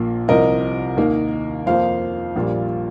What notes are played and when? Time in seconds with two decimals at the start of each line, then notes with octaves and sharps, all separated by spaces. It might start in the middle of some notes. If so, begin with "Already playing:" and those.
Already playing: A#1 A#2 F3 A#3
0.28 C2 C3 F3 A#4 D#5
0.97 D#2 D#3 A#3
1.66 F2 F3 A#3 C5 F5
2.36 A#1 A#2 G3